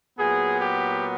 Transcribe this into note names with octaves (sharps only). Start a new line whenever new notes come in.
A#2 F#3 B3 G#4
G4